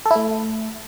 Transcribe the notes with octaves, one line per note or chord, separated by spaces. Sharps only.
A4
E4
A3